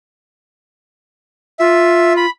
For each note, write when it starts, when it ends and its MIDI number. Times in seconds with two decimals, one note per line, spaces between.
1.60 2.26 65
1.60 2.13 76
2.17 2.30 83